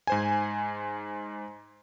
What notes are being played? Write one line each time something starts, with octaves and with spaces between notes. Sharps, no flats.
G#2 C5 G#5